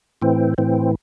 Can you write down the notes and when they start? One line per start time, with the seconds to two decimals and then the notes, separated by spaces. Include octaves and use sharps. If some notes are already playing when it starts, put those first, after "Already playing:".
0.22 A2 E3 C4
0.58 A2 E3 C4